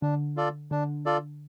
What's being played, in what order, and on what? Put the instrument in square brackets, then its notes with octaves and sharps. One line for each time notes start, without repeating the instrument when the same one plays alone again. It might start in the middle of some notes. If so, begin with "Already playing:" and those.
[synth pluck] D3 [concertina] D4
[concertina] F4 A4 D5
[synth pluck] D3 [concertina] D4
[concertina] F4 A4 D5